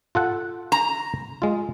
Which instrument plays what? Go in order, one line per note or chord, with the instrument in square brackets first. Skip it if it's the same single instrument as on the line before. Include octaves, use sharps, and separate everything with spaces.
[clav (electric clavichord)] F4 A4 F#5
[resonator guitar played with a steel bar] A#5
[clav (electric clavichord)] G#3 F4